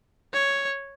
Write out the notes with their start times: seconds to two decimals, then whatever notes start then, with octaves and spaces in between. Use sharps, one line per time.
0.34 C#5